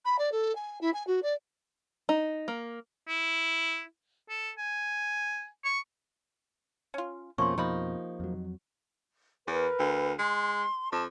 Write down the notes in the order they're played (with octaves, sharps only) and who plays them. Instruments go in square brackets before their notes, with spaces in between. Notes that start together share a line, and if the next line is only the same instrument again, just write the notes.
[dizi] B5
D5
A4
G#5
E4
G#5
F#4
D5
[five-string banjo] D#4
A#3
[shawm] E4
A4
G#5
C#6
[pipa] C#4 F4
[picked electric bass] F2 B2 [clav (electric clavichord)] F3 A#3 C#4 [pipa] A3 [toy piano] C6 C#6
[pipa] C3 D#4 B5 [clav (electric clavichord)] F3 A#3
[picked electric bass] F2 F#3
[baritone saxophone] E2 [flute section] A#4 B4
[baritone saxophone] D2
[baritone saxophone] G#3 [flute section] C6
[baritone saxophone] F2 [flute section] A5